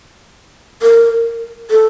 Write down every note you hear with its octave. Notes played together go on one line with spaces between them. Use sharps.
A#4
A4